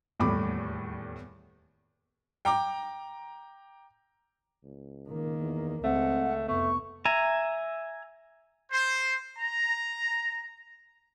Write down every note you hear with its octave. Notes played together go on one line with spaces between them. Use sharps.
D#1 E2 A2 G3 B5 D6
G5 A#5 D6
C#2
D#3 A#3
E2
C#2 G#3 A3 C4 F#5
F1 A3 B3 C#6
E5 G#5 A#5
C5
A#5